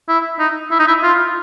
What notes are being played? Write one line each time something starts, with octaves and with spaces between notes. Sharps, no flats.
E4
D#4
E4
D#4
E4
F4